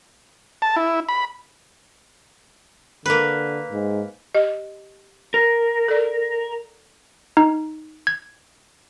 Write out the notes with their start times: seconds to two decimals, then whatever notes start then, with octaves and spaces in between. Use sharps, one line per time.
0.62 A5
0.76 E4
1.09 B5
3.06 D3 A#3 B4
3.72 G#2
4.35 G4 D#5
5.34 A#4
5.88 A4 D5
7.37 D#4
8.07 G#6